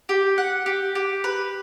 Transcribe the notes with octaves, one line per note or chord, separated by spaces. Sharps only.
G4
F#5
G4
G4
B4